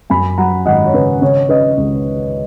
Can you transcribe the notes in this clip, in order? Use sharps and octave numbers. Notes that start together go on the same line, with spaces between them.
F#2 G#5 B5
F#3 F#5 A#5
G#1 D#5 F#5
C#5
C#3 B4
C#3 C#5
C#4 B4 D#5
C#2